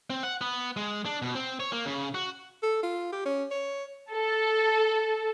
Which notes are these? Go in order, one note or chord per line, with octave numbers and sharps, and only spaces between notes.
C4
F#5
B3
G#3
D4
B2
C4
C#5
A#3
C#3
F#4
A4
F4
G4
C#4
C#5
A4